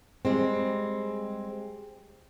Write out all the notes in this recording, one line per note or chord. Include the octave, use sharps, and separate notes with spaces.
G3 G#3 C4